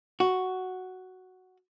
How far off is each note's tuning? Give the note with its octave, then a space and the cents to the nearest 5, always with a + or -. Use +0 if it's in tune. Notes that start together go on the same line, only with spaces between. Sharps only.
F#4 +5